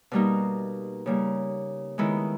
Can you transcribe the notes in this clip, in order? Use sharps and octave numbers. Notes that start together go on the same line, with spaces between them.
B2 G3 A#3 D#4
C#3 G3 A#3
D#3 G#3 B3 E4